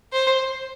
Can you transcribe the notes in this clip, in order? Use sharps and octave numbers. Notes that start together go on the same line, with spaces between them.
C5